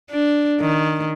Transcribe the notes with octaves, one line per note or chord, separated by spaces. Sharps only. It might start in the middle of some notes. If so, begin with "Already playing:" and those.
D4
D#3